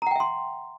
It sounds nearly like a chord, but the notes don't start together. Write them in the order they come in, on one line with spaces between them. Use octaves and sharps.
A#5 F#5 G5 E5 C6